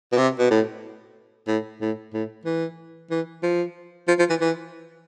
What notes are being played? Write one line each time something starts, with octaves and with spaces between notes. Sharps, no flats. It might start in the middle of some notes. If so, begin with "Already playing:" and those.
B2
C3
B2
A2
A2
A2
A2
E3
E3
F3
F3
F3
E3
E3